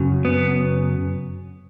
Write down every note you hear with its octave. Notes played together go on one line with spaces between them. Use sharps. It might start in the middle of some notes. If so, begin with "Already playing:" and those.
Already playing: F#2 C#3 F#3
B3